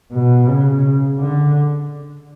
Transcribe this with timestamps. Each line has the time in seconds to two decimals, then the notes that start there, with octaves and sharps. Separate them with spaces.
0.12 B2
0.48 C#3
1.18 D3